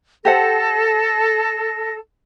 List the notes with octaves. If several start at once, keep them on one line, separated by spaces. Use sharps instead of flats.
G4 A4 C5 F#5 A#6